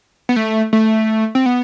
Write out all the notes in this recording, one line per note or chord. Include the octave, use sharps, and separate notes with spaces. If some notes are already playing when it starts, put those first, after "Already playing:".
B3
A3
A3
C4
B3